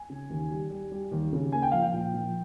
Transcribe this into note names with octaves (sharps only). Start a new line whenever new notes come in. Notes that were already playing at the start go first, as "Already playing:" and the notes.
Already playing: G#5
C#3
D#2
G3
G3
G3
D#2
C#3
A#3 G#5
G5
F3 F5
G5
A#2
F3